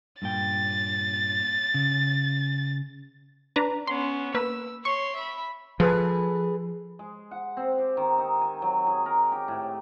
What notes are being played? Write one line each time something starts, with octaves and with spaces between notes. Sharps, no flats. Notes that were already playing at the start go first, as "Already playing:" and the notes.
G2 A#2 G5 A6
C#3
D4 B4 A#5
B3 C#4 C6
A#3 B4 E6
C#5 C6 C#6
E5 B5
F3 G#4 A4 B4
G#3
F#5
C4
G4
D#3
D#4
G#5
F#3
G#4
A#4
G4
A2